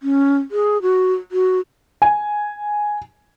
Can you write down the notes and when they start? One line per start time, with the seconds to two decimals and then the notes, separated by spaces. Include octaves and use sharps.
0.03 C#4
0.51 G#4
0.82 F#4
1.32 F#4
2.02 G#5